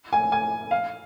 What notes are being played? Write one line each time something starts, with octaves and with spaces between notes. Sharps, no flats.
G#5
G#5
F5